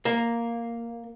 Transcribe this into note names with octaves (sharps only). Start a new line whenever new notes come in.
A#3